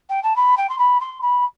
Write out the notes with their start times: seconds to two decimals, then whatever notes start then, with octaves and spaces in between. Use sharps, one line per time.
0.09 G5
0.23 A5
0.35 B5
0.57 G5
0.69 C6
0.78 B5
1.00 C6
1.21 B5